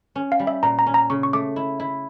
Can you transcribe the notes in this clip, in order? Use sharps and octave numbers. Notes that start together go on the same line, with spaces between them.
C#4
F5
G3
E5
A#2 A#5
A#5
C#4
A#5
C#3 C#6
C#6
A3 D6
E4
E4